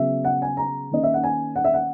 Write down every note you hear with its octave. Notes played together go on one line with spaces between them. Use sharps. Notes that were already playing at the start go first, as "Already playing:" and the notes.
Already playing: C#3 F#3 B3 E5
F#5
G#5
A#5
D#3 A#3 C#4 D#5
E5
F#5
G#5
F#5
E5
F#5